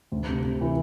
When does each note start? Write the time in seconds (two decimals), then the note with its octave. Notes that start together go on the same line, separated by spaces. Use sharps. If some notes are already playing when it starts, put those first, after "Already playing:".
0.12 D2
0.28 C3
0.44 C3
0.61 E3